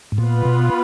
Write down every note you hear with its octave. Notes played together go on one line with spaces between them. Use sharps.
G#2
A#2 B3 F4 B4
B2